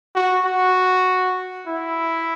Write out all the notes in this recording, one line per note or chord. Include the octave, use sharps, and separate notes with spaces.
F#4
F#4
E4